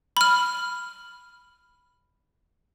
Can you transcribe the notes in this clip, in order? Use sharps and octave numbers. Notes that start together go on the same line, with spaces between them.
B5 F6